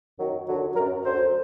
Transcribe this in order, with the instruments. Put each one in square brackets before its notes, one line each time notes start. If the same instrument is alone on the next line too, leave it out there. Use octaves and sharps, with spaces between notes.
[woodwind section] F#2 D#3 F#3
D#2 D3 F#3
F#3 A#4
F#2
D2 D3 F#3 C5